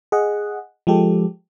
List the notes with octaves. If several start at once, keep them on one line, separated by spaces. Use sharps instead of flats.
G#4 D#5 F#5
F3 G#3 G4 A4